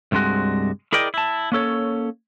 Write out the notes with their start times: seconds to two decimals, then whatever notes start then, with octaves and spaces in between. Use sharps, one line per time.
0.12 C2 G2 C3 G#3 F#4
0.92 E4 G#4 A#4 D5 D#5 G5
1.14 E4 A5
1.52 A#3 C#4 A4 C#5